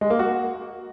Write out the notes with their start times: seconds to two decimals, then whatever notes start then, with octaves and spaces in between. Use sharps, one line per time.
0.01 G#3
0.10 A#3
0.19 F#4